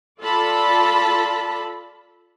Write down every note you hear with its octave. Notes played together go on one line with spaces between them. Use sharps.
F4 A4 D5 A5 B5